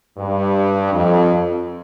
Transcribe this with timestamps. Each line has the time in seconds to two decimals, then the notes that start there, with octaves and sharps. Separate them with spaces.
0.18 G2
0.93 F2